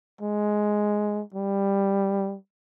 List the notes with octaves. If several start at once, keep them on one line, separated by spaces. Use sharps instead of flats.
G#3
G3